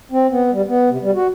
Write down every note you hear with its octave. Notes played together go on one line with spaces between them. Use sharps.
C4
B3
G3
B3
C3
G3
F#4